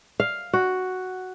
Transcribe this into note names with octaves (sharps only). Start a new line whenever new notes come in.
F5
F#4